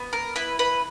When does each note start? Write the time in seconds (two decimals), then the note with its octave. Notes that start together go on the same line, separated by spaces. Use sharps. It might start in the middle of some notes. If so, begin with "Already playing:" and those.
Already playing: B3
0.13 A#4
0.36 E4 B4
0.59 B4